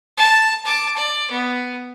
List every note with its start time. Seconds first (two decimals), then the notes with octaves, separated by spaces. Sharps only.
0.17 A5
0.65 A5 D6
0.97 D5
1.31 B3